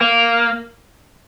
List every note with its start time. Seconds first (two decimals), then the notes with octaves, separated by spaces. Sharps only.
0.01 A#3